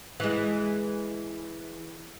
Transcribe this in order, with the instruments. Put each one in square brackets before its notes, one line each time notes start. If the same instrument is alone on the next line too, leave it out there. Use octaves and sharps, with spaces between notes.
[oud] E3 G#3